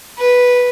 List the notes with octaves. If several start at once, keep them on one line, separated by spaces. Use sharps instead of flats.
B4